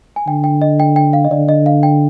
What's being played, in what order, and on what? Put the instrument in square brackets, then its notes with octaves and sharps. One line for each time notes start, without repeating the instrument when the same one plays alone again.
[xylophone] G#5
[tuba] D3 [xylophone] G5
[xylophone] G5
D#5
G5
G5
F5
D#5
[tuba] D3 [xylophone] D5
[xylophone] D#5
F5
G5